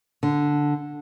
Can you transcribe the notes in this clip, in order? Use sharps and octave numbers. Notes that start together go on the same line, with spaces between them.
D3